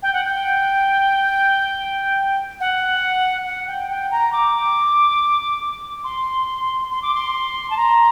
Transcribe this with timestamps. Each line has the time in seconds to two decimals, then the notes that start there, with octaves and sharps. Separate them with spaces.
0.03 G5
0.13 F#5
0.24 G5
2.60 F#5
3.46 F#5
3.68 G5
3.90 G5
4.11 A#5
4.33 D6
6.04 C6
6.91 C6
7.02 D6
7.14 C6
7.70 A5
7.77 A#5